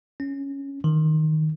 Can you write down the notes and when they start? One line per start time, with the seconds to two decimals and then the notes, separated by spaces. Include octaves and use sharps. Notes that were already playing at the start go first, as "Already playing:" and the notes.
0.20 C#4
0.84 D#3